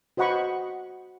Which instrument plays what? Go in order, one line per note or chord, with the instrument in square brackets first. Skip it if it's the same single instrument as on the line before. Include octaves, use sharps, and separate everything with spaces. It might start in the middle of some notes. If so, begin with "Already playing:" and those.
[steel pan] F#4 C5 D#5 F#5 B5 C#6